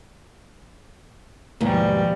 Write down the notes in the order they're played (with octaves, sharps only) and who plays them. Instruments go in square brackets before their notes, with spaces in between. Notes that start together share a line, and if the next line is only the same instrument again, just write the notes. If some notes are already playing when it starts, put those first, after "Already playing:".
[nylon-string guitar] D#2 G#2 B2 [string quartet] F3 G3